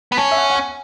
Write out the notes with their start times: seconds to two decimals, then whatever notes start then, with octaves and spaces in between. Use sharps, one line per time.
0.12 B3
0.17 C#4 A5
0.31 E5
0.37 F#5
0.50 F#5
0.55 G#5